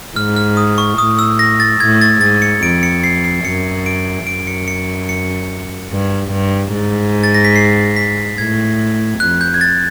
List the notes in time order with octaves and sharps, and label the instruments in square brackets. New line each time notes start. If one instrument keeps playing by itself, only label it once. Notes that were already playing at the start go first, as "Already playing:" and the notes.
[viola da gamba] G#2 [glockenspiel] F6
[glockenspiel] F6
D#6
C#6
[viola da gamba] A2 [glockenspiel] D#6
[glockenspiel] E6
A#6
A6
[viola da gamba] A2 [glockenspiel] G#6
[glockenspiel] A6
[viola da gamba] G#2 [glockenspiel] A6
[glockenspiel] C#7
[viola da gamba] F2 [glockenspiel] D7
[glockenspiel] C#7
C7
C7
[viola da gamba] F#2 [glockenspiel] C#7
[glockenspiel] D7
[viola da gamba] F#2 [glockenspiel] D7
[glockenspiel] C#7
C#7
C#7
[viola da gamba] G2
G2
G#2
[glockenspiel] A6
A#6
B6
C7
B6
[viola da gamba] A2 [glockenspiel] G#6
[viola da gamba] F2 [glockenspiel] F#6
[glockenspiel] G6
G#6
A6